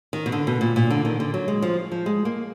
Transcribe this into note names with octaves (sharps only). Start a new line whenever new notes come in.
D#3
B2
D3
B2
A#2
A#2
D3
D#3
D3
F#3
G#3
F3
F3
G#3
A#3